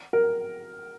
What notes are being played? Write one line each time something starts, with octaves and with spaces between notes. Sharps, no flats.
A#4